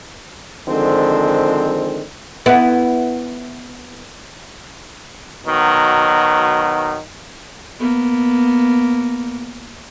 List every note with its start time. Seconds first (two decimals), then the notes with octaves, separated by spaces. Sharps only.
0.68 D3 D#3 F3 G#3 C4
2.46 B3 E4
5.46 B2 D#3 F#3
7.79 A#3 B3